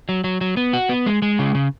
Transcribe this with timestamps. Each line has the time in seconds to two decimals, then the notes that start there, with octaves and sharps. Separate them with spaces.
0.09 F#3
0.24 F#3
0.41 F#3
0.57 B3
0.73 F#4
0.89 B3
1.06 G#3
1.22 G#3
1.39 C#3
1.55 C#3